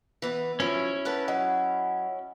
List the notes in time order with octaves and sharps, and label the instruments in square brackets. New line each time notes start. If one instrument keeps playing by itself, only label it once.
[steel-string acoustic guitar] E3 B3
[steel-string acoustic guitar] F3 F#3 [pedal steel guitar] C#4 E4
[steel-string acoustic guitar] A4 B4 F#5
[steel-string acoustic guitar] F#3 [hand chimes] D#5 F#5